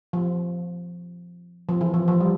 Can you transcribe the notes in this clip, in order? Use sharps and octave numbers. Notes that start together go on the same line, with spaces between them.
F3
F3
E3
F3
F3
G3